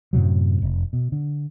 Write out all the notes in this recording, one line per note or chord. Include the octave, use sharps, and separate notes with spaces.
F#2 A2 C3 F#3
F1
B2
D3